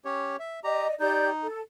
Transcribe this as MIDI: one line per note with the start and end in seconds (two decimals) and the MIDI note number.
0.05 0.36 61
0.05 0.36 67
0.05 0.36 73
0.39 0.60 76
0.64 0.87 67
0.64 0.95 74
0.64 0.95 75
0.64 0.87 82
1.00 1.47 63
1.00 1.28 67
1.00 1.28 74
1.00 1.28 91
1.42 1.59 69